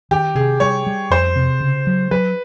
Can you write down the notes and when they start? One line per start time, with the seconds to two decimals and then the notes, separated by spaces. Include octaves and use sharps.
0.11 D#3 G4
0.35 C3 G#4
0.60 G3 C#5
0.86 G3
1.10 F2 C5
1.36 C3
1.61 C#3
1.87 F#3
2.11 F#3 B4